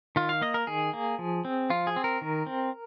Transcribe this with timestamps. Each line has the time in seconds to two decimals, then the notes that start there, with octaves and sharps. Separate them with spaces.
0.16 D#3 F4
0.29 F5
0.41 A#3 D#5
0.54 A#4
0.67 D#3 G#4
0.93 A#3
1.19 F3
1.45 C4
1.70 F3 F4
1.87 G#4
1.96 C4
2.04 A#4
2.21 D#3
2.47 C4